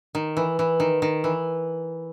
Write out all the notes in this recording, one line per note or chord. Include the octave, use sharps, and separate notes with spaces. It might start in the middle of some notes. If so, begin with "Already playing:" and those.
D#3
E3
E3
D#3
D#3
E3